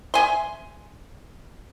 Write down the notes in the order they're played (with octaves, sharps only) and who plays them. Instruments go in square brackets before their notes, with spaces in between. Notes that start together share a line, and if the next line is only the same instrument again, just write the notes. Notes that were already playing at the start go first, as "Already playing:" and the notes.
[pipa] E5 G#5 C6